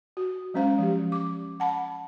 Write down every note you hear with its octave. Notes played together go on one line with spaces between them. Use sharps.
F#4
F#3 G#3 C#4 C5 F5
F3 G4
D6
F#5 A5 B5